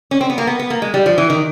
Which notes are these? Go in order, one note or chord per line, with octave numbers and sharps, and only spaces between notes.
C#4
C4
B3
A#3
B3
B3
A#3
G#3
G3
F3
E3
D#3